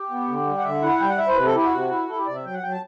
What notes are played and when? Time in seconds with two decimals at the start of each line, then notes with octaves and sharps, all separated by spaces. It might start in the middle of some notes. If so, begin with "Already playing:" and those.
Already playing: G4
0.10 B3
0.28 D3
0.47 G3
0.58 F#5
0.64 D3 E5
0.82 E4 F#5
1.01 G3 G5
1.10 F#5
1.18 E4 E5
1.28 C5
1.36 C3 B4
1.46 A4
1.54 E4 G4
1.64 F#4
1.72 C3
1.91 E4
2.08 E4 A4
2.18 G4
2.27 C3 D5
2.35 E5
2.45 F#3 G5
2.54 F#5
2.63 F#3 G5
2.72 A5